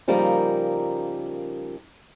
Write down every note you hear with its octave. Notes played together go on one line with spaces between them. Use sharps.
C#3 F3 G3 A#3 D#4 A#4